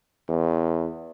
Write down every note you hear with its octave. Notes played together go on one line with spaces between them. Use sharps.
E2